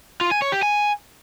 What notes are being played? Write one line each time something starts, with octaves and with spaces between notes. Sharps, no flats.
F4
G#5
C#5
G4
G#5